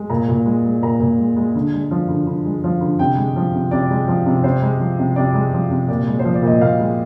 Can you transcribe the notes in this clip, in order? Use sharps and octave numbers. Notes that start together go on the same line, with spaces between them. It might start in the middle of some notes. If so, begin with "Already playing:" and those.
Already playing: G#3
A#2 A#5
A#2
G#3
G#3
A#2 A#5
A#2
G#3
G#3
D3
G#3
F3
D3
D3
G#3
F3
D3
C3 G5
G#3
F3
C3
C3 D5
G#3
F3
C3
C3 C5
G#3
F3
C3
C3 D5
G#3
F3
C3
A#2 D5
G#3
C5
F3
D5
A#2 D#5
A#2 F5
G#3